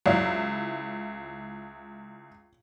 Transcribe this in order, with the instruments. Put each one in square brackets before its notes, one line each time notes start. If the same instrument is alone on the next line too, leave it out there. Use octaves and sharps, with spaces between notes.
[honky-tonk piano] C#2 E4 [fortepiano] F#3 D5 F5